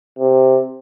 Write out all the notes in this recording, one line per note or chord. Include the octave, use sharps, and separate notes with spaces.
C3